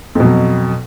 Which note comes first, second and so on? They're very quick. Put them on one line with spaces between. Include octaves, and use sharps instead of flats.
F2 B2 F#3